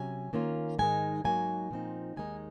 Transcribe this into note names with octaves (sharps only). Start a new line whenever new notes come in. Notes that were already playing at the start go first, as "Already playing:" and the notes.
Already playing: C3 F#3 C#4 G#5
D#3 A#3 C#4 F4
G#2 D#3 G#3 D#4 G#5
G#2 F#3 A#3 D#4 G#5
A#2 F3 C4 D#4
D#2 D#3 G#3 D#4 G#5